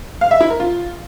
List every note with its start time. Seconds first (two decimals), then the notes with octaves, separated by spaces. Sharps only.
0.21 F5
0.31 E5
0.41 E4
0.50 A#4
0.60 F4